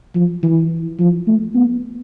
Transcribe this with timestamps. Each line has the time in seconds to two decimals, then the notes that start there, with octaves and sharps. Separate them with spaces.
0.15 F3
0.43 E3
0.99 F3
1.27 A3
1.55 B3